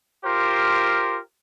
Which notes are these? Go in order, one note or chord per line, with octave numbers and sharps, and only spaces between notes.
F4 G4 A#4 C5